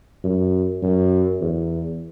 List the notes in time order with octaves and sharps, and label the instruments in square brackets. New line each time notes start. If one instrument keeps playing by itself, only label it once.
[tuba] F#2
F#2
E2